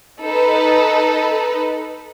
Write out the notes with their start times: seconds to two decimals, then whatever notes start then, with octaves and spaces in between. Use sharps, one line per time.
0.21 D#4 A4 B4